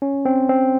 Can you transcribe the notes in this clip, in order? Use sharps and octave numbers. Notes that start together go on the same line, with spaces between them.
C#4
C4
C4